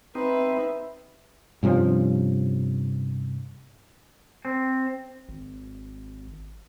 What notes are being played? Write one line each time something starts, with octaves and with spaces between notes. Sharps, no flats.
C4 D#4 B4 E5
G2 C3 F3 C#4
C4
G#1